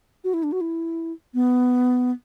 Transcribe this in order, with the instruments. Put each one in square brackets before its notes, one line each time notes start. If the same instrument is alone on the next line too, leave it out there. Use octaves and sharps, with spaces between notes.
[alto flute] F#4
E4
D4
F#4
E4
B3